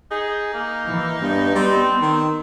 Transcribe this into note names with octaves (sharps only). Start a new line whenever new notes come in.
D#4 G#4
A#3
E3
G2 B3
G3 C4
D#3